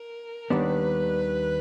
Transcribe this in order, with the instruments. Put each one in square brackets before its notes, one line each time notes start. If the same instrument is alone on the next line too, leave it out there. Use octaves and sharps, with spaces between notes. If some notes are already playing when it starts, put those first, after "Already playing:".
Already playing: [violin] A#4
[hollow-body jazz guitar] D#2 D#3 G3 B3 D4 [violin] B4